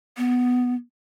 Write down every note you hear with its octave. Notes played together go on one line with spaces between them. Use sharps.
B3